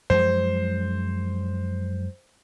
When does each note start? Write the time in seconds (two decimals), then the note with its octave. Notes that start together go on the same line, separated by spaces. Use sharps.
0.10 F#2 F3 G#3 C5